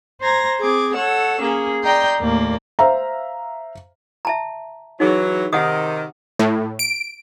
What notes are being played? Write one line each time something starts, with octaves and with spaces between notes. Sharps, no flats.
C5 A#5 G#6 A#6
C4 G#4 D6 G#6
A4 C#5 F#5 E6
A#3 C#4 G#4
D5 D#5 G5 A#5 C6 G6
D#2 A2 A#3 D5
C5 E5 F5 A#5
E5 A5 A#5
E3 F#3 D#4 G#4
C3 D#3 F#5 D#6
A2
D7